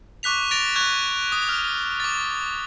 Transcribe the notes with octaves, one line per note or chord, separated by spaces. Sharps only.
C#6 D6 F#6 B6 F7
A6 A#6 D7 F7
C#6 F#6 G#6
D#6
F6
D6 A6